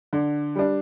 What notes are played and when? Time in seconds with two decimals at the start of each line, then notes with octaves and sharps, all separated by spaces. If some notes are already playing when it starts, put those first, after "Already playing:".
0.13 D3
0.56 G3 D4